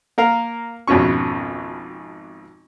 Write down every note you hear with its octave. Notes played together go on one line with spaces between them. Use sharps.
A#3 A#4 F5
G#1 F2 B2 C#4 C#6